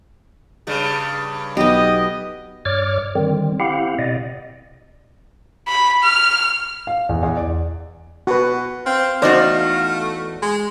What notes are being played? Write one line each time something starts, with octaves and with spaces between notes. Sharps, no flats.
G2 C#3 G3
B1 B3 G4 D#5
G2 C#5 D5 D6 F6
D3 D#3 G3 C4
C4 E4 G4 F5 F#5
B2 D5 D#5
B5
F6
F5
E2
E2
D5
B2 F#4 B4
C4 F5
E2 A3 D#4 F#4 C5 D5
G#3